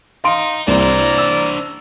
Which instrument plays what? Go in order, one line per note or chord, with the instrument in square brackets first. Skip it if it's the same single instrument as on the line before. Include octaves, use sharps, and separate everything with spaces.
[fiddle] D#4 [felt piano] F5 C6 D7
[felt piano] C2 [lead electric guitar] D4 C5 [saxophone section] E4 A#4 D5 [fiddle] A#5
[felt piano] E6